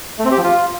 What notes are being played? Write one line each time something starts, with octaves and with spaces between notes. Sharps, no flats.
A3
C4
G4
F3
F4